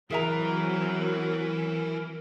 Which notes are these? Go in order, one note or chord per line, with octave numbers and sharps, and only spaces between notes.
E3 F#3 C4 G#4 A#4 E5 A#5